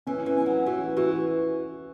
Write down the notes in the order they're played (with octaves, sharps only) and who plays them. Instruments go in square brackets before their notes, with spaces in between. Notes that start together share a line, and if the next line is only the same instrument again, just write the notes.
[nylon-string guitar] E3 [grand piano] C#4
[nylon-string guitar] E3
[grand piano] C#4
[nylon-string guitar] F#3
[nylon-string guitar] E3 [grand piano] F#4
[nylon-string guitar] E3 [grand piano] F#4